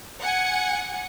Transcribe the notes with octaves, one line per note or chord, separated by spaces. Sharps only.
F#5 G#5 C#7